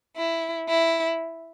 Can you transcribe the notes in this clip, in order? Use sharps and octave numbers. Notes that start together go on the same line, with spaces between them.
E4
E4